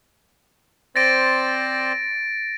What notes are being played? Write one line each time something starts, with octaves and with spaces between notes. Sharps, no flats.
C4 C5 D5 A6 A#6 D7